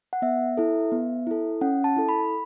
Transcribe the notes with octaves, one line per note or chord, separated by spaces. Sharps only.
F#5
B3 E5
E4 A4
B3
E4 A4
C#4 F#5
A5
E4 A4
B5